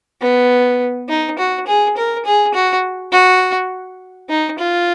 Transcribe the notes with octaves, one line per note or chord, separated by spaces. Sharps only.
B3
D#4
F#4
G#4
A#4
G#4
F#4
F#4
D#4
F4